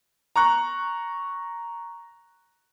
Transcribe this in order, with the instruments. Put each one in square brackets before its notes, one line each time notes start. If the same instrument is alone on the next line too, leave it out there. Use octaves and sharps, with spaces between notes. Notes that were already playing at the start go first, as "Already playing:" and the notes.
[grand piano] A#5 C#6 F#6